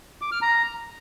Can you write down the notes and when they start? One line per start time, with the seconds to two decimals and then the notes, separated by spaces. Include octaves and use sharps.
0.21 D6
0.32 F6
0.42 A#5